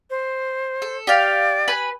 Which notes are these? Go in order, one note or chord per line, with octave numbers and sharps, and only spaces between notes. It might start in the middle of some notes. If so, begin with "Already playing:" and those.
C5
A4
G4 D5 F5
B4 G#5 B5